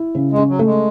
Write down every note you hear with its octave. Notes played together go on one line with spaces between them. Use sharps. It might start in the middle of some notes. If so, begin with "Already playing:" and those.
Already playing: E4
C#3
G#3
C#4
F#3
A3
G#3